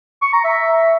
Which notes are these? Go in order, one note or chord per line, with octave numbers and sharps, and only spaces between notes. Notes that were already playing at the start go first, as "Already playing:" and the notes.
C#6
A#5
E5